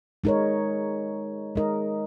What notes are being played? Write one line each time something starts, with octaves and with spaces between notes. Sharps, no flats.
G#3 D#4 A#4 C#5
G#3 D#4 A#4 D#5